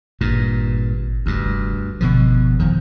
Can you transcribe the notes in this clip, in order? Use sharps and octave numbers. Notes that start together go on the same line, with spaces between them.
G#1 G2 A#2
F1 D2 G2
G1 B2 D3 F3
F2 D#3